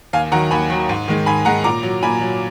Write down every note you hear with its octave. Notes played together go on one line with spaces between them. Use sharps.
D#2 F5 G#5
D#3 F#3 F#5 A#5
D#2 G#5 B5
D#3 F#3
G#2
D#3 G#3
G#2 G#5 B5
D#3 G#3 F#5 A#5
A#2 A#5 D6
F#3
A#2 G#5 B5
F#3